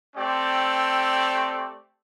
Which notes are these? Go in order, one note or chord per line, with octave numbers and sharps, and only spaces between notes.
A3 C4 G4 D5